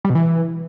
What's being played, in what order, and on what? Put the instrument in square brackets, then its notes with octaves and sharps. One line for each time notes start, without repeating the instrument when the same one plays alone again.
[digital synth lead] G3
B2
E3